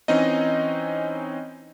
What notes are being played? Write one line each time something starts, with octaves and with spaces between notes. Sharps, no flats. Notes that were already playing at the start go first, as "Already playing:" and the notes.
E3 C4 C#4 D#4 D#5